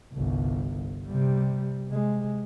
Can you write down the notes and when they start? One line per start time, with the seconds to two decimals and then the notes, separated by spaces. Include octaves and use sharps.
0.13 G1 C2
1.08 C3 G3
1.87 C3 G#3